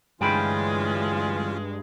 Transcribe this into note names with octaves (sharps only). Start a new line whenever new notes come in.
D2 G2 E3 G#3 C#4 F4 G5 B5